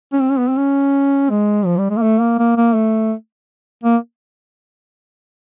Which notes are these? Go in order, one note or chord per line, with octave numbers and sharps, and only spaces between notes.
C#4
C4
C#4
B3
C4
C#4
G#3
F3
G3
G#3
A#3
A3
A#3
A#3
A#3
A3
A#3